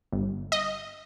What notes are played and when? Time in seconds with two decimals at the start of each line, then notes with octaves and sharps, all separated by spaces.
0.12 G1
0.52 D#5